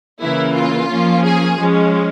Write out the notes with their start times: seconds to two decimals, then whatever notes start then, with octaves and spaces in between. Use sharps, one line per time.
0.21 C#3 E3 A#3 E4
0.55 F4
0.89 F3 A#3 C#4
1.23 G#4
1.57 F3 G#3 C#4